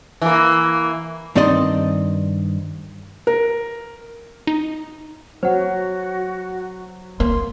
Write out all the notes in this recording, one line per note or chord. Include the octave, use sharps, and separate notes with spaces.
E3 A#3
G2 D#3 C4 D5 D#5 C6
A#4
D#4
F#3 F#4 C5 C#5 F#5
A#3 C6